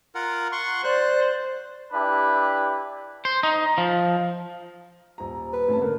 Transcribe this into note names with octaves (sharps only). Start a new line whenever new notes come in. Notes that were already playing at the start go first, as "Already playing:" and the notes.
F4 A#4 F#5
F#5 C6 C#6
C5 D5 F#6
D4 E4 G4 B4
C5
D#4
F3
D#1 A#5
B4
F1 A3 C#4 A5
D3 A#4